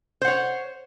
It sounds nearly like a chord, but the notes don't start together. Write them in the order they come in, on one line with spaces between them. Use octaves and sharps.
C5 F#5 C#5